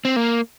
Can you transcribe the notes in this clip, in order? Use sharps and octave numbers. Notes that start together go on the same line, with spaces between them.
C4
A#3